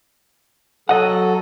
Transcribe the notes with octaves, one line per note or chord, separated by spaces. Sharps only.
F#3 A4 D#5 F#5